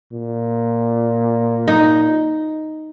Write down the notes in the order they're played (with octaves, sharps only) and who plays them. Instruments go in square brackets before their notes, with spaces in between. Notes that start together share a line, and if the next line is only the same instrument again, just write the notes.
[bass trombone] A#2
[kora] D#4